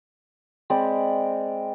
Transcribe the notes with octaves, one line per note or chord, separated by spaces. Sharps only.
G#3 C4 D5 B5